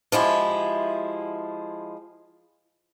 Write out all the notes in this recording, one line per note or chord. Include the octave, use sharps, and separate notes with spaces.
F3 G#3 E4 G4